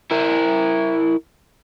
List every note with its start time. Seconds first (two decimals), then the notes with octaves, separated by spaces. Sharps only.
0.11 E4 A#4